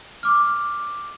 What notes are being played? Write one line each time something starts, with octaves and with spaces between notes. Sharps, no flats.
D6 F6